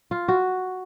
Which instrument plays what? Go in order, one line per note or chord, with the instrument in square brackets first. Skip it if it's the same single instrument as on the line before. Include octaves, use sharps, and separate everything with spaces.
[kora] F4
F#4